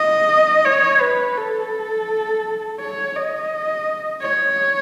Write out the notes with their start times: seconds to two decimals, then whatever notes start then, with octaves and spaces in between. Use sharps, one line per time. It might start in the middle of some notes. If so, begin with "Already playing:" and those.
Already playing: D#5
0.65 C#5
1.00 B4
1.37 A4
2.80 C#5
3.16 D#5
4.22 C#5